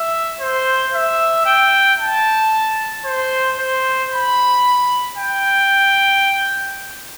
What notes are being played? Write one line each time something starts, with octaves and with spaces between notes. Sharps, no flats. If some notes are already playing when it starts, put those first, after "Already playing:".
Already playing: E5
C5
E5
G5
A5
C5
C5
B5
G5